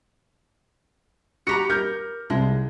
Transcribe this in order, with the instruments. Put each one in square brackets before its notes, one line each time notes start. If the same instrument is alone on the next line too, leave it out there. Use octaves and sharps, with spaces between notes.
[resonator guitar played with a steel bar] F#4 G4 A#5 [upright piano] C#7
[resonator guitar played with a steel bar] A#4 [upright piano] G6
[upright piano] C2 [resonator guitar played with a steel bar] G#3